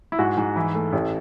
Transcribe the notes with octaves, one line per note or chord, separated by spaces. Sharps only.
E4
G#2 F#4
G#2
E3 E4
A3
A1